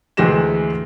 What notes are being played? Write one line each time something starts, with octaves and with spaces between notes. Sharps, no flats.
D2 E3 G#3 G4 A#6 E7